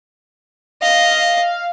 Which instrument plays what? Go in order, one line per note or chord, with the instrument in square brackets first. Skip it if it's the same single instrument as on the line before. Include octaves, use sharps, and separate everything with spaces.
[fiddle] D#5 [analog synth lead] F5